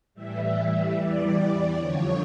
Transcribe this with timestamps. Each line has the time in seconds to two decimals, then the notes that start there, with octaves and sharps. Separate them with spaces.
0.14 A2 E3 G3 E5
0.95 E2 E3 G3 D5
1.76 F2 D3 F3 C#5